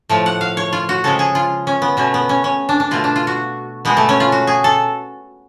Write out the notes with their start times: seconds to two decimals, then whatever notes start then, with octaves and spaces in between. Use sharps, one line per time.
0.09 A2 F3 A3
0.26 F#5
0.41 F5
0.57 C#5
0.73 F4
0.89 F#4
1.04 C#3 F3 G#3 A4
1.19 G#4
1.35 F4
1.67 C#4
1.82 B3
1.97 B2 A3 C#4
2.14 B3
2.29 C#4
2.44 C#4
2.69 D4
2.80 D4
2.91 B2 A3 F4
3.04 D4
3.16 F4
3.27 F#4
3.85 B2 G#3 B3
3.97 A3
4.09 C#4
4.20 F4
4.32 F#4
4.47 G#4
4.64 A4